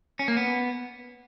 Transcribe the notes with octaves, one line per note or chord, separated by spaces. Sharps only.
C#4
A#3
B3